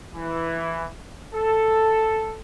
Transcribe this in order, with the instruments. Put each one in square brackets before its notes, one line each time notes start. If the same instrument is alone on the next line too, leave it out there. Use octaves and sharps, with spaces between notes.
[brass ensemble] E3
A4